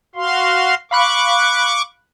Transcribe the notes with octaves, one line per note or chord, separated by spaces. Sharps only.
F#4 F5 C6
F5 B5 C#6 D6 F#6